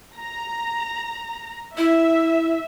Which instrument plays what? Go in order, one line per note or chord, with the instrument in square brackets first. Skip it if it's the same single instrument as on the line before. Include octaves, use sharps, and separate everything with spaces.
[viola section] A#5
[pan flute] E4 [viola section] E5